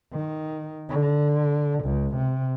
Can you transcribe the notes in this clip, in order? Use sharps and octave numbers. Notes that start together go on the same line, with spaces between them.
D#3
D3
C#2
C3